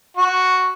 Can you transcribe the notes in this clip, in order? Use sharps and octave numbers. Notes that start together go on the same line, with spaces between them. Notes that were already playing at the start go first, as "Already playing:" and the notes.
F#4